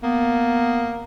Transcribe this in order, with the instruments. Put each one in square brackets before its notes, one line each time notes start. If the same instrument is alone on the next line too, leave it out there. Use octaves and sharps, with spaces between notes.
[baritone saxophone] A#3 [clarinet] B3